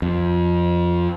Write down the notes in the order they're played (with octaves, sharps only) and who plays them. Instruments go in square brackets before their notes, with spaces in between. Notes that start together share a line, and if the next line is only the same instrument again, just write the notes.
[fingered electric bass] F2